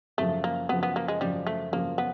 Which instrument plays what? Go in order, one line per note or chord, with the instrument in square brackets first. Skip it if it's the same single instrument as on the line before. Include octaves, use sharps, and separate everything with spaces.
[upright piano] F#2 C#3 F3 [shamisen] A3
[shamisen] A#3
[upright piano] F#2 C#3 F3 [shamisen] B3
[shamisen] B3
A#3
G#3
[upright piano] F#2 C#3 F3 [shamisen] G3
[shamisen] A3
[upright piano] F#2 C#3 F3 [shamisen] A#3
[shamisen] B3